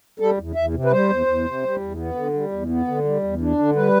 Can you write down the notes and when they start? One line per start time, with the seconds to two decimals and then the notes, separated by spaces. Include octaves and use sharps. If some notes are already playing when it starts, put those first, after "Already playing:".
0.19 G3 A4
0.38 E2
0.55 E2 E5
0.74 C3
0.85 B4
0.91 G3 C5
1.10 E2
1.26 E2
1.45 C3
1.63 G3
1.80 E2
1.98 B3
2.15 D3
2.34 G3
2.52 E2
2.69 B3
2.88 D3
3.05 G3
3.23 E2
3.41 D4
3.59 D3
3.75 G3 B4